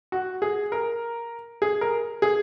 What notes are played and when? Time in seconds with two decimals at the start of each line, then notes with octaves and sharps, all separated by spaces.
0.12 F#4
0.42 G#4
0.72 A#4
1.62 G#4
1.81 A#4
2.22 G#4